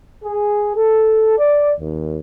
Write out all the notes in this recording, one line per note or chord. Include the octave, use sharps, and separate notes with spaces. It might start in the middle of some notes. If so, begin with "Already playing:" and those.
G#4
A4
D5
D#2